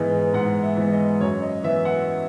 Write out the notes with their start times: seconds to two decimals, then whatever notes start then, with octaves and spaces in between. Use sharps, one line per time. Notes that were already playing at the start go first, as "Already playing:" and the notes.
Already playing: G#2 E3 G#3 B3
0.34 G#2 F#5
0.63 E5
0.77 E3 G#3 B3
0.92 D#5
1.21 F#2 C#5
1.42 D#5
1.63 E3 B3 E5
1.85 F#5